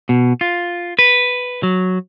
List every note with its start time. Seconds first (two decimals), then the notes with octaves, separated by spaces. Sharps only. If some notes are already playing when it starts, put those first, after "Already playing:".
0.09 B2
0.41 F4
0.99 B4
1.63 F#3